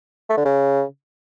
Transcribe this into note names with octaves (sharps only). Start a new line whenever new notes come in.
A3
D3
C#3